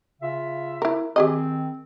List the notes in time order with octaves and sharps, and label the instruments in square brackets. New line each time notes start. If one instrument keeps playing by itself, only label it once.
[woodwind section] C#3 F4 E5
[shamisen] E4 A#4
[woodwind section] D#3 C4 [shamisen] G4 G#4 D#5